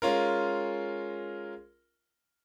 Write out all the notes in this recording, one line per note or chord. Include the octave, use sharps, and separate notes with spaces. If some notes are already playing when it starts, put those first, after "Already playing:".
G#3 C#4 F4 A#4